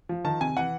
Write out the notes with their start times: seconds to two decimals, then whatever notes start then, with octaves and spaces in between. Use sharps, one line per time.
0.09 F3
0.25 D#3 A5
0.41 C3 G#5
0.57 E3 F#5